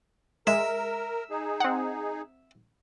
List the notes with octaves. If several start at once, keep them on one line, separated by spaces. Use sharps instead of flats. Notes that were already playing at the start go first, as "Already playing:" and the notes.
G#3 A#4 E5
D#4 G#4
C4 F#5